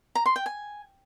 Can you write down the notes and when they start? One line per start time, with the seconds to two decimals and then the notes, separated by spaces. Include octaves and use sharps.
0.15 A#5
0.26 C6
0.36 G5
0.46 G#5